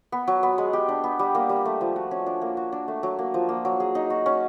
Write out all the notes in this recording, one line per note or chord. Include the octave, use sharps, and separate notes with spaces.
B3
F#3
B3
G#3
G4
D4
B3
G3
A#3
G3
A3
F3
F#4
C#4
D4
A#3
F#4
D4
A3
F#3
A#3
F3
A#3
F#3
G#4
D#4
F#4
C#4